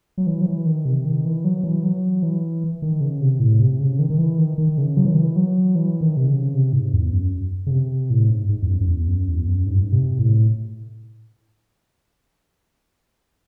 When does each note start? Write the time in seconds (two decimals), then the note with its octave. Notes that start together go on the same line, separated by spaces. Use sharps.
0.18 F#3
0.27 E3
0.41 F#3
0.47 E3
0.66 D#3
0.85 C3
1.05 D#3
1.25 E3
1.44 F#3
1.63 E3
1.84 F#3
2.23 E3
2.82 D#3
3.01 C#3
3.21 C3
3.40 A2
3.60 C3
3.79 C#3
3.99 D#3
4.10 D#3
4.18 E3
4.38 D#3
4.58 D#3
4.78 C#3
4.97 F#3
5.05 E3
5.11 D#3
5.19 E3
5.36 F#3
5.75 E3
6.01 D#3
6.17 C3
6.28 C#3
6.54 C3
6.73 G#2
6.93 E2
7.12 F#2
7.66 C#3
7.71 C3
8.10 A2
8.30 G#2
8.49 G#2
8.62 E2
8.69 F#2
8.81 F#2
8.88 E2
9.08 F#2
9.28 E2
9.47 F#2
9.67 G#2
9.74 F#2
9.81 G#2
9.92 C3
10.19 A2